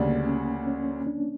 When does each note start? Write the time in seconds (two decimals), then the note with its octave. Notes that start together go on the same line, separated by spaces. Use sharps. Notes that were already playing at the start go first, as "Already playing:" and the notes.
Already playing: D2 C#3 G3 A#3 D4
0.27 C#4
0.67 C#4
1.07 D4